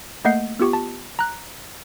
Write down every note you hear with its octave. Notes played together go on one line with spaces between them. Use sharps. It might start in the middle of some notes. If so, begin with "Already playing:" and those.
A3 A#3 D#5 F#5 G6 C7
B3 F4 G4 C#6
A5
A#5 F#6